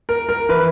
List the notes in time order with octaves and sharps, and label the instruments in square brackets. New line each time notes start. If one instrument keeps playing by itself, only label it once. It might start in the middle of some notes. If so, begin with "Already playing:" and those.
[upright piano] A#4
A#4
E3 B4